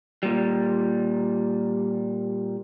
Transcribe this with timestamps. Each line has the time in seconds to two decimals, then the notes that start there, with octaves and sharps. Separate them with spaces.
0.23 A#2 G3